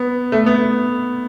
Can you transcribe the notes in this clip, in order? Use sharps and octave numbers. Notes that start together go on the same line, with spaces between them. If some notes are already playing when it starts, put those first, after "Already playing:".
Already playing: B3
A3
B3